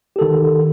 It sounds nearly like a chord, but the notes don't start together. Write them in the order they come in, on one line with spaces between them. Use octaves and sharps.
G4 A4 D#3